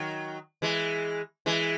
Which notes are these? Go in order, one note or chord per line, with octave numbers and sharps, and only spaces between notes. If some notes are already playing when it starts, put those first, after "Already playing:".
Already playing: D#3 F#3
E3 G#3
E3 G#3